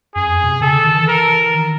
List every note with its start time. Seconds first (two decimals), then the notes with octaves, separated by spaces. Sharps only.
0.15 F#2 G#4
0.26 F2
0.38 F#2
0.44 B2
0.49 C3
0.61 C#3 A4
0.73 D3
0.85 D#3
0.97 E3
1.07 A#4
1.54 D#3